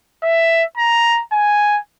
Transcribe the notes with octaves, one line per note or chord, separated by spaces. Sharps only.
E5
A#5
G#5